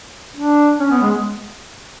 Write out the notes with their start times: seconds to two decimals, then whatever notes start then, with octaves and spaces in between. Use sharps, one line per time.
0.37 D4
0.80 C#4
0.91 B3
1.02 G#3